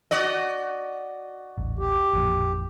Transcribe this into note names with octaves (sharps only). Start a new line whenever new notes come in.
F#4 D5 D#5
D#1 A1
G4
A1 F2 A#2